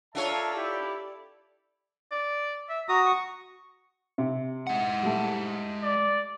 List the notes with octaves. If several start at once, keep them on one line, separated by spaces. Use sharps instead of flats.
D4 F4 A4 A#4 C#5 D5 E5 A5
E4 G4
D5
E5
F#4 A#5 D#6
C#6
C3
G#3 F#5
G3 A3
D5